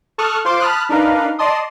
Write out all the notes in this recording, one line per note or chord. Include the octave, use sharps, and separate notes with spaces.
A4 A5 C#6 D#6 F6 F#6
F4 C5 C6 D6
A5 B5 D#6 F6 F#6
D4 D#4 A#4 B4 F5
D5 D#5 A5 C6 D#6